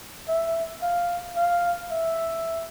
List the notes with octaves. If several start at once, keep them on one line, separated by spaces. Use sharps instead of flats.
E5
F5
F5
E5